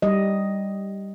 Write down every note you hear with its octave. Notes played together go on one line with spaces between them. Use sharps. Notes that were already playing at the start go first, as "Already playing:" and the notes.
G3 D#5